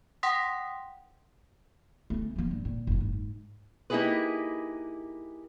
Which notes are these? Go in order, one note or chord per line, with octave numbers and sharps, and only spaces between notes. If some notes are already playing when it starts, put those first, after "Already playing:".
F#5 G5 C6 D#6 A#6 B6
A3 C#4
F3 A#3
G2
A#2
F#1 B1
G#2
A#3 D#4 E4 G4 G#4 B4